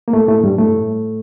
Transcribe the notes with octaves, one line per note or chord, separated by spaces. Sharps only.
A#3
A2 A3
A2 A3
G2 G3
A2 A3